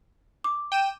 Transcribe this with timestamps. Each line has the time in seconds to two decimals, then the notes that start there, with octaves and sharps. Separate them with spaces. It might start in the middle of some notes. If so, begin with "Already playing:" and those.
0.44 D6
0.72 G5 D#7 E7